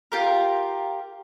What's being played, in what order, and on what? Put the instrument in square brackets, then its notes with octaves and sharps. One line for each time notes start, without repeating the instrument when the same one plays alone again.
[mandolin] F4 G4 A#4